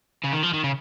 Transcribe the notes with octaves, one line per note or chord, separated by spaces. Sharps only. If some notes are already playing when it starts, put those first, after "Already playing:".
C#3
D#3
F3
D#3
C#3